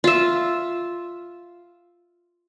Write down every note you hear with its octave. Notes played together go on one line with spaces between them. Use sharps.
F4 E5